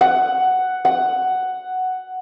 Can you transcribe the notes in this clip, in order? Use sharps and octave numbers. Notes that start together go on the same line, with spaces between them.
F#5
F#5